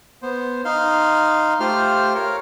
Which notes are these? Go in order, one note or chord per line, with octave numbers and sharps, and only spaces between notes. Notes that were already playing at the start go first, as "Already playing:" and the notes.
B3 C5
D#4 F5 C6
A3 F4 G4 C5 C6 F6
A#4 C#5 F5